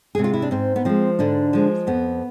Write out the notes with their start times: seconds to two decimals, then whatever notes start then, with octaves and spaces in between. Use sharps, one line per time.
0.15 C3 G#3 G#4
0.24 F4
0.34 E4
0.42 D4
0.51 G#2 C4
0.76 B3
0.85 F3 G#3 C4
1.19 G#2 D3 D4
1.53 F3 G#3
1.87 F2 B3